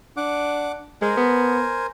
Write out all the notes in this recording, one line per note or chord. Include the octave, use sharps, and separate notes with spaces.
D4 F#5 D6
G#3 A#4 C5 G#5
B3